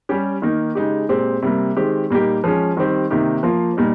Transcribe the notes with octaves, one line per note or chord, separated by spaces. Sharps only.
G3 C#4 G4
D#3 A#3 D#4
C#3 G#3 D#4 G4
A#2 G#3 C4 G4
C3 G3 A#3
D#3 G#3 C4 G4
A#2 G3 A#3 D#4 G4
F3 G#3 C#4
D#3 G3 C4 G4
C3 D#3 A#3 D#4 G4
F3 A#3 F4
A#2 G3 A#3 D#4